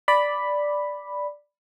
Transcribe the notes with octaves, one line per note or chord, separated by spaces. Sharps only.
D5 B5